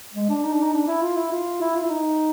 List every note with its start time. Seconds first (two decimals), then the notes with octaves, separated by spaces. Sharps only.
0.14 G#3
0.29 D4
0.44 D#4
0.53 D4
0.63 D#4
0.74 D4
0.88 E4
1.02 F4
1.16 E4
1.32 F4
1.61 E4
1.75 F4
1.83 E4
1.90 D#4